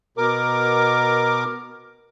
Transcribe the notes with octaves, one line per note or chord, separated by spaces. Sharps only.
B2 A#4 D6